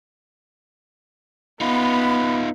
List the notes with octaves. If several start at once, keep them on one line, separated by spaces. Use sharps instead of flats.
B3 D#4 F4 B5